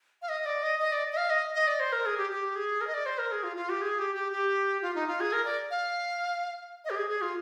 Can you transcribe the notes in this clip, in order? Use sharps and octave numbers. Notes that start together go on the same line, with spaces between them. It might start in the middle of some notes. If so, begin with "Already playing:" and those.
F5
D#5
D5
D#5
D#5
D5
D#5
F5
D#5
D#5
D5
C5
A#4
G#4
G4
G4
G#4
A#4
D#5
D5
C5
A#4
G#4
F4
F4
G4
G#4
G4
G4
G4
F4
D#4
F4
G#4
A#4
D5
F5
D#5
G4
G#4
G#4
F4